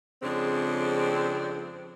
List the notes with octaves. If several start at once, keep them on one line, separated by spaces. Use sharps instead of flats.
F2 C#3 G#3 C4 D4